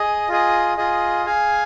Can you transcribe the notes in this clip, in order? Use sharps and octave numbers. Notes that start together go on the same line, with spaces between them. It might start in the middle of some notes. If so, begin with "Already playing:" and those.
Already playing: G#4 D#5
F4 G#4 D#5
F4 G#4 D#5
G#4 F5 G#5